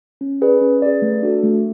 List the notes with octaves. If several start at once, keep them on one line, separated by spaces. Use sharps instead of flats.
C#4
G#4 B4 D5
C#4
G#4 B4 D5
A3
D4 F#4 A4
A3